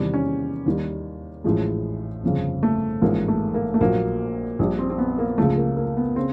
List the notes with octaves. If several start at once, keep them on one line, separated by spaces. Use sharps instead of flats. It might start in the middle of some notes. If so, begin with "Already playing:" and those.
Already playing: E2 C3 D#3 G3
C#4
D#2 D#3 G3
A1 A2 F3 G#3
G1 F2 C#3
A3
A1 G#2 F3 G#3 A#3
A3
A#3
A3
A#1 A#2 F#3 A#3
A#1 A#2 G3
C4
C4
B3
A#3
C#2 C#3 F3 G#3 A3
A#3
A#3
B3
C#3 C4